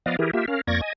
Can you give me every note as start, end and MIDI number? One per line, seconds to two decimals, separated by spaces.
0.06 0.17 53
0.06 0.17 59
0.06 0.17 74
0.06 0.17 75
0.06 0.17 77
0.19 0.31 52
0.19 0.31 64
0.19 0.31 67
0.19 0.31 68
0.19 0.31 70
0.33 0.46 58
0.33 0.46 65
0.33 0.46 67
0.33 0.46 76
0.48 0.61 61
0.48 0.61 70
0.48 0.61 77
0.67 0.81 41
0.67 0.81 58
0.67 0.81 74
0.67 0.81 85
0.67 0.81 92
0.67 0.81 94
0.81 0.93 75
0.81 0.93 80